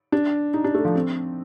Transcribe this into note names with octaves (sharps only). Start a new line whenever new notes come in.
D4
D#4
D4
A3
F3
C4